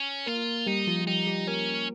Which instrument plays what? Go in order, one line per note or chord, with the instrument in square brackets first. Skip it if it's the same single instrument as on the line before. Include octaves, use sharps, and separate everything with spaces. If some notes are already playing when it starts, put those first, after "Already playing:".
Already playing: [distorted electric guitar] C#4
[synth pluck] A#3 A#4 [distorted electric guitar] F4
[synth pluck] G3 G4 [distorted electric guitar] D#4
[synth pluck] F3 F4
F4
[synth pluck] G3 G4 [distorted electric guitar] D#4
[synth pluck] G3 G4
[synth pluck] A#3 A#4 [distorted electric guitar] C#4